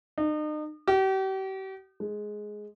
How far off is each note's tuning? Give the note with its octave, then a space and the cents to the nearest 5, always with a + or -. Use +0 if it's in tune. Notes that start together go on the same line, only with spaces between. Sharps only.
D#4 -40
G4 -40
G#3 +10